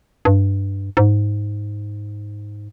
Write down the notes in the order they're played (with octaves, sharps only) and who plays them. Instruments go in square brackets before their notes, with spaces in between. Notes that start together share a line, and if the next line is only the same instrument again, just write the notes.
[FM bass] G2
G#2